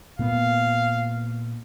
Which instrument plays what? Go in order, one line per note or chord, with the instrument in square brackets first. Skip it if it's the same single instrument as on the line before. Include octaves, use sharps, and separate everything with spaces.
[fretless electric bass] A#2 A#3 B3 [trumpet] F5